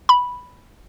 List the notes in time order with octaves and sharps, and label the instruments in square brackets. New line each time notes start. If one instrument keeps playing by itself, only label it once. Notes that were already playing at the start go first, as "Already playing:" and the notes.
[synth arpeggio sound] B5